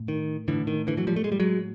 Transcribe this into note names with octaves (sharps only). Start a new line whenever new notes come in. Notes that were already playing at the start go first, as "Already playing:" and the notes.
Already playing: A2
D#3
A2 D3 E3
D#3
D3 E3
E3 F#3
F3 G3
A3
G#3
G3
F#3 G#3